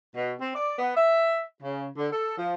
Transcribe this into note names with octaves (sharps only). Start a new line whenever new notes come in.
B2
C4
D5
B3
E5
C#3
D3
A4
F3